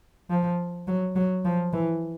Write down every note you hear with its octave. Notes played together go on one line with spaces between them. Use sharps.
F3
F#3
F#3
F3
E3